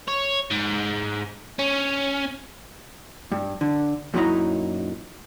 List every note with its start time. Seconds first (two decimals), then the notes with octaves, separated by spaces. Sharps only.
0.08 C#5
0.51 G#2
1.59 C#4
3.32 G2
3.61 D3
4.14 F#2 A#2 F#3 D#4 E4 A#5